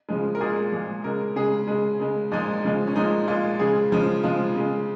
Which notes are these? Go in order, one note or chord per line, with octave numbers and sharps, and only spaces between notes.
C#3 F3 G#3
A#4
A#2 G#3 G#4
A#2 F3 G#3
C#3 G#3 A#4
C#3 G#3 G#4
C#3 G#3
C#3 G#3
A#2 F3 G#3 D#4
C#3 F3 G#3
C#4
A#2 F3 G#3 D#4
A#2 G#3 F4
C#3 F3 G#3 G#4
C#3 F3 G#3
C#3 F3 G#3 F4
C#3 G#3